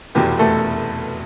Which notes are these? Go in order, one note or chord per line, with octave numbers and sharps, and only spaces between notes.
F1 E2 B2 G4
A3 A4